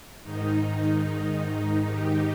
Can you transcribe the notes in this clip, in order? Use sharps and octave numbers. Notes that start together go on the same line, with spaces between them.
G#2 D#3 D#4
G4